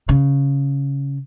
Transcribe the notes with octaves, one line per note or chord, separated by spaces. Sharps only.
C#3